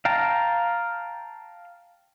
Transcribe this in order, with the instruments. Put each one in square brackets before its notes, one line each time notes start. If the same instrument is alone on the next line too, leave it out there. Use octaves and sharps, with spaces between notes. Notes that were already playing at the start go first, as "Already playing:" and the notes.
[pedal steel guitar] F5 G5 A5 A#5